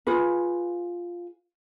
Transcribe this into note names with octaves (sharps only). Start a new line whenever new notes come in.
F4 G#4 B4